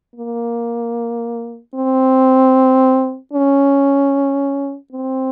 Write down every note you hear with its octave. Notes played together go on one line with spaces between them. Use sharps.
A#3
C4
C#4
C4